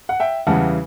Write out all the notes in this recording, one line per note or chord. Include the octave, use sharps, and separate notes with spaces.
F#5
E5 G5
E2 C#3 E3 G3 F#5 A5